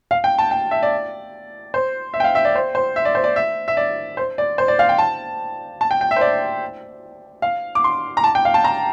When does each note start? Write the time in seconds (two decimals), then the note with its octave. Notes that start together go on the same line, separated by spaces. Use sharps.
0.11 F5
0.24 G5
0.38 A5
0.51 G5
0.71 E5
0.83 D5
1.74 C5
2.14 E5
2.20 G5
2.24 F5
2.35 E5
2.45 D5
2.55 C5
2.75 C5
2.96 E5
3.05 D5
3.15 C5
3.24 D5
3.36 E5
3.68 E5
3.77 D5
4.17 C5
4.38 D5
4.58 C5
4.68 D5
4.79 F5
4.89 G5
4.98 A5
5.81 A5
5.91 G5
6.01 G5
6.11 E5
6.16 C5
6.21 D5
7.42 F5
7.75 D6
7.84 C6
8.17 A#5
8.24 A5
8.35 G5
8.45 F5
8.54 A5
8.64 A#5